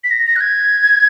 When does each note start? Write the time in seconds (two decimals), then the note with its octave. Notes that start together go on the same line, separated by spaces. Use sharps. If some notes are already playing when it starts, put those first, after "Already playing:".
0.04 B6
0.11 A#6
0.27 A#6
0.36 F#6
0.41 G#6